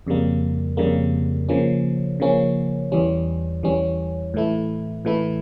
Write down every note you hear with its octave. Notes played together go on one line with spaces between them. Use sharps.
F2 C#3 G3 A#3
F2 C#3 G3 A#3
C#3 F3 A#3 C#4
C#3 F3 A#3 C#4
E2 E3 G3 C#4
E2 E3 G3 C#4
A2 E3 A3 E4
A2 E3 A3 E4